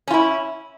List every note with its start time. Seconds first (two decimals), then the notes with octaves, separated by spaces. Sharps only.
0.08 C#4
0.11 F4
0.14 E4